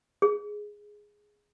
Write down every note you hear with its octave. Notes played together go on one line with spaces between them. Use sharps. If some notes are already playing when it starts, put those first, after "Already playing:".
G#4